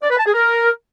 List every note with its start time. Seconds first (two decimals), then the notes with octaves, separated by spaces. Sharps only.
0.03 D5
0.11 B4
0.18 A5
0.26 G#4
0.34 A#4